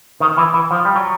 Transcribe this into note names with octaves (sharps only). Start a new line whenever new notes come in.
D#3
E3
E3
F3
G3
F#3